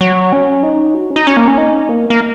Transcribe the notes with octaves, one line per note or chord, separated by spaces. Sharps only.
F#3
C#4
D#4
F#4
C#4
D#4
C#4
A#3
C#4
D#4
A#3
A#3